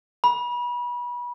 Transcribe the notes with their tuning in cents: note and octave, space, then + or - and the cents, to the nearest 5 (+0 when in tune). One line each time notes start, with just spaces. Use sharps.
B5 -30